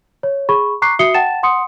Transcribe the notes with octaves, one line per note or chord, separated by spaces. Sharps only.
C#5
G#4 B5 C#6
A#5 C#6 D6 F#6 C7
F#4 E5 D#6 C7 C#7 G7
F#5 G5 A5 A6 E7
F#5 C6 D#6 C#7